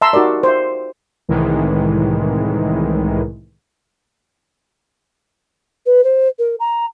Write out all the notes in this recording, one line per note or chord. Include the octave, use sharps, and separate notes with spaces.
E5 A5 A#5 C6 E6
D#4 F#4 G4 A#4 D5
C5 E5
C2 A2 D#3 E3 G#3
B4
C5
A#4
A#5